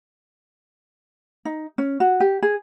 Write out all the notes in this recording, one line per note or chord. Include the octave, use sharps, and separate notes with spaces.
D#4
C#4
F#4
G4
G#4